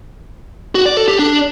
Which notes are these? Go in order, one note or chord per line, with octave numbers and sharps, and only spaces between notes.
F#4
D5
A4
G4
D4